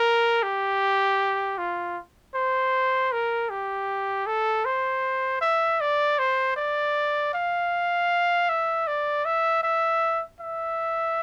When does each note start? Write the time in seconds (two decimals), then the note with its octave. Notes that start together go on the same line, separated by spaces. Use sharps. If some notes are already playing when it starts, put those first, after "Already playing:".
Already playing: A#4
0.43 G4
1.58 F4
2.35 C5
3.13 A#4
3.50 G4
4.27 A4
4.65 C5
5.41 E5
5.81 D5
6.19 C5
6.57 D5
7.34 F5
8.49 E5
8.87 D5
9.25 E5
9.63 E5
10.41 E5